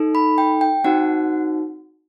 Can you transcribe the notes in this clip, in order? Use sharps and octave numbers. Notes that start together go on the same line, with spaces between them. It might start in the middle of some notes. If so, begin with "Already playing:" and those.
Already playing: D#4 A4
B5
G5
G5
C4 D#4 F#4 F#5